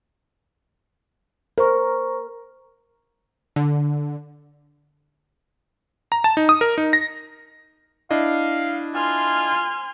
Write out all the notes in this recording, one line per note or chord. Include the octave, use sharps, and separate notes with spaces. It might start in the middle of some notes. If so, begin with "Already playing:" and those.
A#4 C5 C#6
D3
A#5
A5
D#4
D#6
A#4
D#4
A#6
D4 E4 D#5 F5
F4 G#5 C6 F6